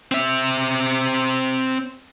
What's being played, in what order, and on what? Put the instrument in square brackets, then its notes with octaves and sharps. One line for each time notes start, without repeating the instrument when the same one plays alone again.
[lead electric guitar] C4 E5